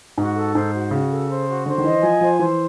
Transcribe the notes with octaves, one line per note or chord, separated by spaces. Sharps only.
G#2 F#4
A4
G#2 C5
F#4
C#3 F#4
A4
C5
F#4
D3 C5
D#3
E3 D#5
F3 G#5
F3 C5
E3 C5